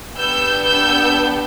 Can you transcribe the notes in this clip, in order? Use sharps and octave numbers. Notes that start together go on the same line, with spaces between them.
B3 D4 G4 E6 G6
E6 G6